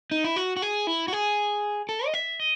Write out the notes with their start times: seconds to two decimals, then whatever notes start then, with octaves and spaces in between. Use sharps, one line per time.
0.11 D#4
0.24 E4
0.36 F#4
0.56 F#4
0.62 G#4
0.87 E4
1.08 F#4
1.13 G#4
1.89 A4
2.06 D#5
2.14 E5
2.40 D#5